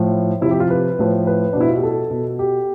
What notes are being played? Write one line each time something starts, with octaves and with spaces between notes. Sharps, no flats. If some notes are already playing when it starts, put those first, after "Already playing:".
Already playing: A2 F3
C3 F3 E4
G4
F4
B4
A2 F3
B4
B2 D4
E4
F4
G4
A4
B2
G4